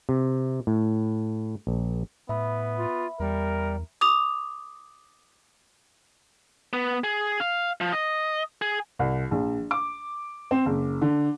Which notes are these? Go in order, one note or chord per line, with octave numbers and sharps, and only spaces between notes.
C3
A2
A#1
A2 B3 E5 B5
F4
E2 G3 A#4
D6 D#6 F7
B3
G#4
F5
F3
D#5
G#4
C2
A#1
D6
C4
F#1
D3